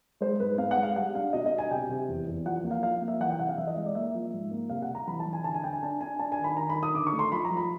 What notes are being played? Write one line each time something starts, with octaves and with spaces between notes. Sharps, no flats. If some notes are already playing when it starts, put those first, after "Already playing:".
G#3 C5
G#2 B4
B3 F5
F#5
G#3
F5
G3 F#5
D4 F5
B2 D#5
D#5
D4
G#5
C3 G5
C3
E2
E2
F3 F#5
A#3
F5
F3 F5
A#3
E5
E3 F#5
G5
C3 F#5
F5
E3 E5
D#5
G#3
D5
A#3 E5
F3
G#2
A#3
C3 F5
F#5
C3
A#5
E3 B5
A5
E3
G#5
D3 A5
G#5
D4 G5
G#5
D4 A5
D4 G#5
D4 A5
G#5
D#3
B5
D#3 A#5
B5
D#3
D#6
D3 D6
C#6
A3
C6
F3 B5
A#5
F3
B5